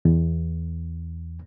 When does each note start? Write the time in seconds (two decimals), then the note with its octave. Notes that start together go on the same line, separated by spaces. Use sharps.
0.05 E2